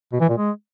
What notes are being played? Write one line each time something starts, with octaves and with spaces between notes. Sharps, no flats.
B2
E3
A#2
G#3